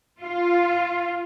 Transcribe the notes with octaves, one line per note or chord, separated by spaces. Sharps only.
F4